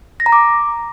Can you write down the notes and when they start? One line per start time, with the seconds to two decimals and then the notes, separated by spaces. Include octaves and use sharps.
0.20 A#6
0.26 A#5
0.32 D6